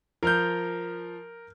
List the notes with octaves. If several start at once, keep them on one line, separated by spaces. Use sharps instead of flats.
F3 A#4 F6 G6